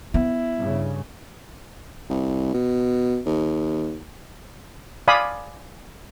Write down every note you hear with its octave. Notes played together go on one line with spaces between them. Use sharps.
B3 E4
G2 C#3
C2
B2
D#2
D5 F5 G#5 B5 D#6